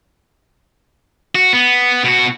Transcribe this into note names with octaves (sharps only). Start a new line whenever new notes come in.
F#4
B3
B2 F#4